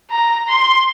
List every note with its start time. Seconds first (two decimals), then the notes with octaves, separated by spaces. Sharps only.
0.11 A#5
0.48 C6